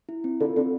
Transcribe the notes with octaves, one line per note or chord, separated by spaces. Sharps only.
E4
C4
D3 F4
D3 C4